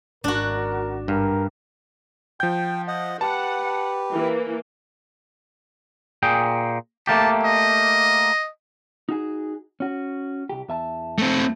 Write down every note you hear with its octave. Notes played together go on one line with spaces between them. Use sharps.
G#1 D4 F#4 A#4
G2 A#4
F3 G5 G6
D#5 F#5
G4 B4 F#5 A5
E3 A#3
A#2 G#4 G5
A3 A#3 G4 A5
D#5
D#4 F#4 G#4
C#4 F#4
C2 G4
E2 E5 A5
A3 C4